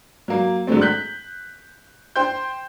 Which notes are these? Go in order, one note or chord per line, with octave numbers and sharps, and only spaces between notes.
F#3 A#3
D3 F#3 G#3 A3 C4
F#6 G6 B6
C5 G5 C6 G6